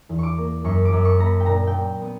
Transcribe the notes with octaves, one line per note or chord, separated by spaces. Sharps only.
E2
C#6 D6
A#3
F#2 C#6
D6
F#2
C#6
A#3 A#5
B5
G5
A#2 A#5
G5
A#2
B3